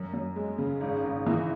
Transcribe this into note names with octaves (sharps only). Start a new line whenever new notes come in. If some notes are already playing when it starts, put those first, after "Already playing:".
Already playing: F#2
F#2
G#3
C#3
G#1
G#1
E3